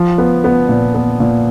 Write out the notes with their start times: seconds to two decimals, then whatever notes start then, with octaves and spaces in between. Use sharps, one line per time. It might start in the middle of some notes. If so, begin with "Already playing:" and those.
Already playing: F3
0.18 B3
0.44 B3
0.69 A#2
0.95 B3
1.20 A#2